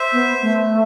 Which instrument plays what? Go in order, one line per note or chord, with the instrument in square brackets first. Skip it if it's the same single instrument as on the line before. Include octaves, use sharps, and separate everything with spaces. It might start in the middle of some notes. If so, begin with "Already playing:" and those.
Already playing: [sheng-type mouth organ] C5 E5
[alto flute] B3
A3